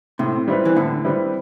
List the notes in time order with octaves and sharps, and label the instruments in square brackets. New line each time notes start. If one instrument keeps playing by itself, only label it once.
[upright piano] A2 [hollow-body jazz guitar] C3
[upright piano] G3 C4 E4 B4
[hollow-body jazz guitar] E3
[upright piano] A2 [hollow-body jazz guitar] D3
[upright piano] G3 C4 E4 B4